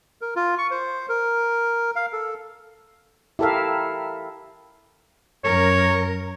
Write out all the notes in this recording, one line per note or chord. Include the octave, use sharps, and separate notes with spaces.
A#4
F4
C#6
C5
A#4
F5
A4
E4 G4 A4 A#4 E5 F5
F#2 A#4 C#5